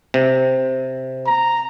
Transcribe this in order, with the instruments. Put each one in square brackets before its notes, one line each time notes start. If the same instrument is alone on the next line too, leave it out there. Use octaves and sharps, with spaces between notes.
[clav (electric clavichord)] C3
[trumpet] A#5